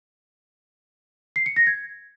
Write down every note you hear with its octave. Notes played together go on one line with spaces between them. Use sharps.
C7
C#7
A#6
G#6